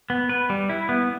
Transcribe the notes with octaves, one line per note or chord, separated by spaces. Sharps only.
B3
B4
G3
E4
B3